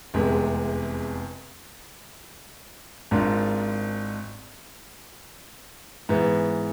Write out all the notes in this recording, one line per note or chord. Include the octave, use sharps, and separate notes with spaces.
F1 E2 C3 G#3
G#1 G#2 G#3 D4 F4
G#2 E3 B3